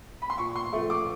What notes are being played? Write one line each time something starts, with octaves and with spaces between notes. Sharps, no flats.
B5
C6
A#2 C#6
C6
F3 A3 C#6
D6